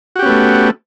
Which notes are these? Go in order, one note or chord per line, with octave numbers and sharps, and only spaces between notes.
A3 B3 C#4 F#4 G4